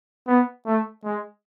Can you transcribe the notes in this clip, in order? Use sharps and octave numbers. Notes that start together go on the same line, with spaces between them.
B3
A3
G#3